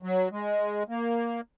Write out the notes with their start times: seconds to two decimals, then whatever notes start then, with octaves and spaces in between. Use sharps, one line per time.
0.03 F#3
0.31 G#3
0.89 A#3